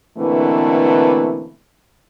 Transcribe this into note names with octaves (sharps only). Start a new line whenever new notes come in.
B2 D3 E3 A3 A#3 C4